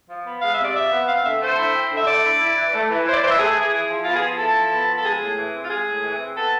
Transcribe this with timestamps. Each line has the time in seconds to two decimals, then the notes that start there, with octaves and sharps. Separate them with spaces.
0.08 F3
0.25 B3
0.41 G#3 F5
0.52 E5
0.58 C3
0.63 D5
0.74 F3 E5
0.91 B3
1.07 C4 F5
1.24 D3 E5
1.41 A3 C5
1.57 E4
1.73 C4
1.90 D3 E5
2.06 A3 D5
2.23 E4
2.40 E4
2.55 E3
2.73 A3
2.89 E3
3.06 E4 C5
3.13 D5
3.21 E3 C5
3.30 E5
3.38 A3 G#4
3.55 E3
3.72 E4
3.88 F3
4.04 B3 F4
4.15 G#4
4.20 F3
4.37 E4 A4
4.54 F3
4.71 B3
4.87 F3
4.96 A4
5.04 G#3 G#4
5.20 A2
5.37 E3
5.53 C4
5.63 F4
5.69 G#3 G#4
5.85 A2
6.02 E3
6.19 C4
6.35 B3 A4